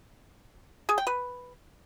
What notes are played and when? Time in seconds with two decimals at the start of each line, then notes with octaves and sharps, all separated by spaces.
0.89 G#4
0.98 G5
1.07 B4